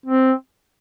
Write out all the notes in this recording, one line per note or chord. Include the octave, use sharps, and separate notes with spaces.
C4